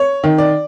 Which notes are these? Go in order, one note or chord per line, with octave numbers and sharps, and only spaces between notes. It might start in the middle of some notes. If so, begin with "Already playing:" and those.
Already playing: C#5
D#3
D5